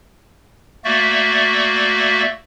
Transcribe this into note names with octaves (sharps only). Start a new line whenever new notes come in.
A3 A#3 F#4 D5 E5